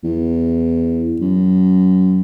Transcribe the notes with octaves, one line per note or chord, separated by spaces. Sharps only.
E2
F#2